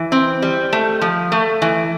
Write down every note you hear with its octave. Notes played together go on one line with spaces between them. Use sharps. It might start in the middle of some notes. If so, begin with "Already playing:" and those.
Already playing: E3
C4
G3
A3
F3
A3
E3